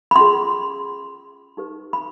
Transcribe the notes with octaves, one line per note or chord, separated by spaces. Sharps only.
B5
C#4 F4 G#4 C6
D#4 G4 B4
B5